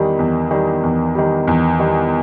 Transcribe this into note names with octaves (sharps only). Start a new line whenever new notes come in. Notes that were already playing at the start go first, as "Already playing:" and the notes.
Already playing: E2 D#3 G3
E2
D#3 G3
E2
D#3 G3
E2
D#3 G3